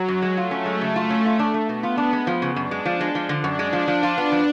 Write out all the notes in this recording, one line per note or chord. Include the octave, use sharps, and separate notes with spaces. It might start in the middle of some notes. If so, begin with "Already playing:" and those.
Already playing: F#3
F#2
G#3
A3 F4
C#4
G#3
C#3 A3
F4
C#4
F4
D4
A3
B2 B3
F4
D4
G#3
F3
C#3
F#2 D4
G#3
F3
G#3
F3
D3
F#2 D4
G#3
F3
F3
F4
B3
F3